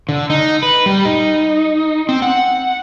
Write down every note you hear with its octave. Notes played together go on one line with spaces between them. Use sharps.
D3
D#4
B4
G3
D#4
C4
F#5